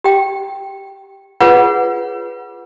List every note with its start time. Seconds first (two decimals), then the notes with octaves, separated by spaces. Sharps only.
0.04 G4 G5
1.40 F4 G#4 B4 C#5 F#5